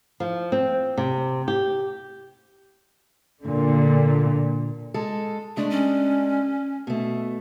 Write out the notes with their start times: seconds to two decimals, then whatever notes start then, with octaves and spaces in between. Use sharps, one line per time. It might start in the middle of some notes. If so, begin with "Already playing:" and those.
0.20 F3
0.52 C4
0.97 C3
1.48 G4
3.44 A#2 D3
4.94 G#3 A4
5.57 G#3 A3 D4
5.70 C#4
6.87 B2 A3